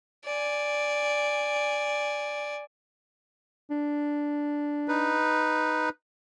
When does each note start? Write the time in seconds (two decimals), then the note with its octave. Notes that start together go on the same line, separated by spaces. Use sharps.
0.25 D5 G#5
3.70 D4
4.88 D#4 B4